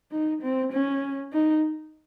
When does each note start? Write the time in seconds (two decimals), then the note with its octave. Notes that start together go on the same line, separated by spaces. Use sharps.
0.12 D#4
0.42 C4
0.72 C#4
1.33 D#4